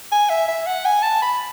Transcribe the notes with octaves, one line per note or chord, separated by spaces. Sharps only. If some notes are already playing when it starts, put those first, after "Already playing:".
G#5
E5
E5
F#5
G#5
A5
B5